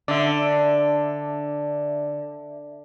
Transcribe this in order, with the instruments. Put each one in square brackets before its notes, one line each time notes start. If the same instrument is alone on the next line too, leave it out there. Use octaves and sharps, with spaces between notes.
[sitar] D3 [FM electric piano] D5 E5